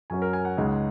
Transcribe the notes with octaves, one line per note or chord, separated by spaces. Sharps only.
F#2 F#3 C#4 G#5
A#4
G#5
F#5
C#2 C#3 G#3 D#4